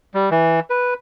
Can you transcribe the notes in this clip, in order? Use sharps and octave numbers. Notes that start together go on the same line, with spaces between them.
G3
E3
B4